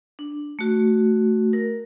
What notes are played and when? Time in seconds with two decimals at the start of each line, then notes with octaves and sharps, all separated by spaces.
0.19 D4
0.59 A3 F#4
1.53 A#4